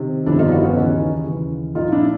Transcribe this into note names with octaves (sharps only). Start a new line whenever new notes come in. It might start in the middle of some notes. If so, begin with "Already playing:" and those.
Already playing: C3 D#3
G1 F2 C3 D#3 D4 E4
D#4 F4
E4 F#4
B3 C#4
D#2 C#3 E3 C#4 D#4
D#2 C#3 E3
A#1 A#2 D#4 F4
D4 E4